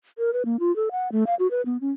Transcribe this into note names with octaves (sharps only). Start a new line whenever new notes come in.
A#4
B4
A#3
F4
A4
F#5
A3
F5
F#4
B4
B3
C#4